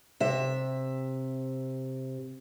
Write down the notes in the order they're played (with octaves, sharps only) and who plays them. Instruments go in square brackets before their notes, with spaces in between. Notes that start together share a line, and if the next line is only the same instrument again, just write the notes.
[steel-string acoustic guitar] C3 E5